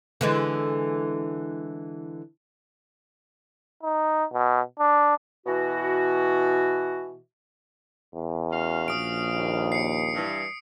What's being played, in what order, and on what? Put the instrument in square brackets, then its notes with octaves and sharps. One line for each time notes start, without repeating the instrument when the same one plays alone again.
[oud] D3 E3 G#3
[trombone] D#4
B2
D4
[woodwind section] B2 E3 F#4
[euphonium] E2
[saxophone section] C#4 F#4 F5
[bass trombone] A#1 [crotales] D#6 D7
[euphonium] D#2
[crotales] C7 C#7
[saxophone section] G2 E3